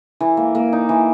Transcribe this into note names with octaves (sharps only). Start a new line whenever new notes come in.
E3
A#3
A#3
D#4
E3